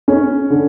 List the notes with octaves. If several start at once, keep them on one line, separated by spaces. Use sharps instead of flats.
C#4
D3